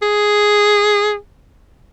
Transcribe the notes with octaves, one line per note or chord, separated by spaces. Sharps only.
G#4